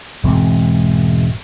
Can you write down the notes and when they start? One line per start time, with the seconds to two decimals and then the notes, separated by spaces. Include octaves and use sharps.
0.23 E1 G#2 E3 C4